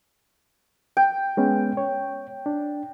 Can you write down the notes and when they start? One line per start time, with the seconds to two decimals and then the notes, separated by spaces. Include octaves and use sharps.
0.97 G5
1.37 G#3 B3 C#4
1.77 C#5
2.46 D4